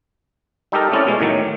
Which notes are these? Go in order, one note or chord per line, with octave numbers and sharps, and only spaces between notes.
G3 D#4 G4 A4 A#4
A3 C4 C#4 E4 G4 D5
B2 G#3
A2 D#3 F#3